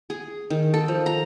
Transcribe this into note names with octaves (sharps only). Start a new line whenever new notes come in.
G#4
D#3
A4
F3
A#5